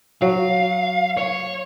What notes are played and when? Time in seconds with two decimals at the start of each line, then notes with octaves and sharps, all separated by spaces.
0.22 F#3 F5
1.17 C#5